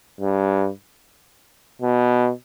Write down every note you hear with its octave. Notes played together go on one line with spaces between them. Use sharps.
G2
B2